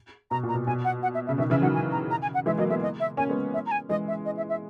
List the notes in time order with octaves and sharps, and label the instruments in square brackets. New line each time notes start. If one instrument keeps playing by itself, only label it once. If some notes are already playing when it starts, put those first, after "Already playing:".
[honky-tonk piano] B2 [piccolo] A#5
[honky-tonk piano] A#2
[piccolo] A#5
[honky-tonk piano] B2
[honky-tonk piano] B2 [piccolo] G#5
[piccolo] F#5
F#5
E5
[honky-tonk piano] C#3 [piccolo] E5
[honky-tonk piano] B2 D#3 [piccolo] E5
[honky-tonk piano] C#3 E3 [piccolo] E5
[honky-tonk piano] D#3 F#3 [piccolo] F#5
[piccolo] G#5
A#5
A#5
G#5
F#5
[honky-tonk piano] E3 G#3 [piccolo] E5
[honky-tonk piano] F#3 A#3 [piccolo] D#5
[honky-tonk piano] G#3 B3 [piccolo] E5
[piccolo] D#5
E5
[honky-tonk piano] A#3 C#4 [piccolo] G#5
[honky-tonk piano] G#3 B3
[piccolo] E5
A#5
G#5
[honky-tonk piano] E3 G#3 [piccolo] D#5
[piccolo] E5
D#5
E5
E5